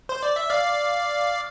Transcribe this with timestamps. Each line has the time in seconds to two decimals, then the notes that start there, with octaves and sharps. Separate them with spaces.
0.09 C5
0.23 D5
0.36 E5
0.50 D5 F5